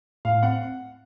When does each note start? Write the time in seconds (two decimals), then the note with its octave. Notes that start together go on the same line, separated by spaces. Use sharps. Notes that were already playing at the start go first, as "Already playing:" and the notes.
0.25 A2 F5
0.43 C4 F#5